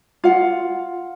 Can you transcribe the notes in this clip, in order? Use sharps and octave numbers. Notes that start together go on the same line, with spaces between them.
F4 F#5